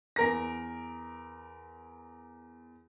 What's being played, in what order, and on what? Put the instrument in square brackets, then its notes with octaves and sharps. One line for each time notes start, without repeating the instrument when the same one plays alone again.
[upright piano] E2 A#4 A#6